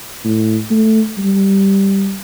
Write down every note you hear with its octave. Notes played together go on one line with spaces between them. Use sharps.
A2
A3
G3